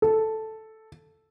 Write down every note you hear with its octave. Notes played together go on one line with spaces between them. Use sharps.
A4